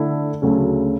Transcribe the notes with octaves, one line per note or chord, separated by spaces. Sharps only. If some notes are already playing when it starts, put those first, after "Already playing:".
Already playing: D3 A3 E4
D2 C#3 F#3 A3 C#4